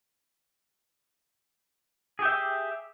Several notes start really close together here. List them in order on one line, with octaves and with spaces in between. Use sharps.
G#4 G4 E5 G5